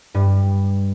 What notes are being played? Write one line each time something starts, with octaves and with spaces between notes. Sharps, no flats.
G2